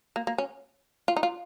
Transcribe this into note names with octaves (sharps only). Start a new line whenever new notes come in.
A#3
A#3
C#4
F4
D#4
F4